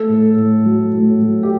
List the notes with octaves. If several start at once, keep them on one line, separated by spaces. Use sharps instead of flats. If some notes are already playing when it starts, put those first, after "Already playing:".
Already playing: A3 A4
A2
A2
F#3
A2
F#3
G4